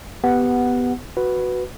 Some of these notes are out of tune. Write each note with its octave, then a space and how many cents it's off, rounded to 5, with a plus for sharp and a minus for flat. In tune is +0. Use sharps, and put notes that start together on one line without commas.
B3 +0 G4 +0 F#5 +0
F#4 +0 B4 +0